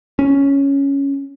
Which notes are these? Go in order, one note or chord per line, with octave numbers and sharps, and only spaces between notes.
C#4